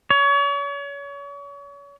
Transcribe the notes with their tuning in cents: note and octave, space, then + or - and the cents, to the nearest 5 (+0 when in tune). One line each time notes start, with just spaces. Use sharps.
C#5 +35